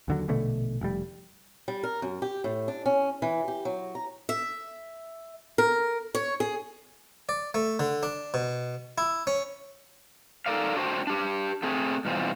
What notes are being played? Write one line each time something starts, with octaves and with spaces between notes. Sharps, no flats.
D#2 D3 F#3
A#1 B2 D3 A3
F1 G3
G3
A#4
F#2
G4
A2
D4
C#4
E3
G4
F#3
A#5
E5
A#4
C#5
G#4
D5
A3
D3
D4
B2
E4
C#4
D#4 A4 A#4 D5 F5
D4 F#4 C5 F#5 G5
D4 G4
A3 C4 G#4
G2 B2 E3 C4 F4